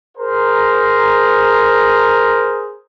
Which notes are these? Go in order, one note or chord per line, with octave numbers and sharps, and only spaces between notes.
G#4 A#4 C5 A#5